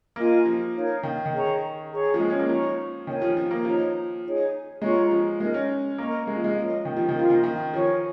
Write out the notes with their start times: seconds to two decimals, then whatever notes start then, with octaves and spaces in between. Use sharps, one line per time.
0.16 A#3 F4 A#4 D#5 G#5
0.46 F3
0.74 D#4 A#4 C#5 F5
1.03 D#3
1.26 D#3
1.32 G#4 C#5 A#5 C#6
1.90 G#4 C#5 A#5 C#6
2.14 F3
2.20 G#3
2.30 C#4
2.39 A#3
2.49 F3 D#4 C#5 A#5 C#6
3.07 D#3 A#4 C#5 G#5
3.22 F3
3.37 F3
3.51 A#3
3.65 F3 D#4 C#5 A#5
4.23 D#4 G#4 C#5
4.82 G#3 F4 C#5 A#5 C#6
5.11 F3
5.40 G#3 D#4 A#4 D#5
5.54 C#4
5.98 A#3 A#4 D#5 A#5 C#6
6.27 G#3
6.36 F3
6.44 G#3
6.56 F3 C#4 A#4 D#5
6.85 D#3
6.97 F3
7.09 D#3
7.14 F3 F4 A#4 F5
7.30 D#3
7.44 D#3
7.74 F3 A#4 C#5 G#5 C#6